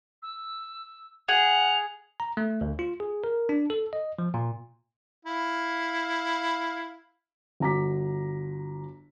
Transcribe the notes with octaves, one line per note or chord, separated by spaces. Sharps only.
E6
G#4 F#5 F7
A#5
A3
D2
F4
G#4
A#4
D4
A4
D#5
F3
A#2
E4 F5
G1 F#4 A#5 D6 B6